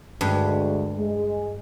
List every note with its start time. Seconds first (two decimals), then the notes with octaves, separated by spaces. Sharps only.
0.21 D2 G2 G#3
0.98 G#3